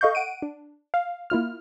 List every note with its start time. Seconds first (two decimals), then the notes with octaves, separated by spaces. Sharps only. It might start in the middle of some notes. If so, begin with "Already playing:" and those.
0.01 A4 D#5 F5 C#6 G6
0.15 F#5 D7 D#7
0.42 D4
0.94 F5
1.30 A#3 E4 F4 F6